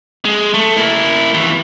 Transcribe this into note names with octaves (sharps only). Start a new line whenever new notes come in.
G#3
A3
A#3 E4
D#2 E3